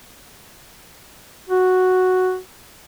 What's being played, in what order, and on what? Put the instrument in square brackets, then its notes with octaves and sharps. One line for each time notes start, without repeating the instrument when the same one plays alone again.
[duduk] F#4